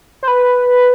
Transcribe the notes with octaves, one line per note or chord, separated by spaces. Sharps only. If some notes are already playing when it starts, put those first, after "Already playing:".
C5
B4